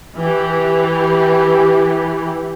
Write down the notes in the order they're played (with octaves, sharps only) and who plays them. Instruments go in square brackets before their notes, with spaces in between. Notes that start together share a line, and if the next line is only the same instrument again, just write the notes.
[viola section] E3 G4